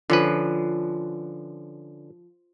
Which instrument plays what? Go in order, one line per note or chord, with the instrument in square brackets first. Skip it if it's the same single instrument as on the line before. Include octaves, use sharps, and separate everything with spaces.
[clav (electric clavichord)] D3 C#4 B4 [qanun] F3